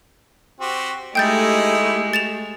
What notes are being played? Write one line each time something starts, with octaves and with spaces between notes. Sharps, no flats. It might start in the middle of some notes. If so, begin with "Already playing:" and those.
C4 F#4 G4
G#3 A3 D#4 E4 G4 G5 G6 A6
A6 E7 F7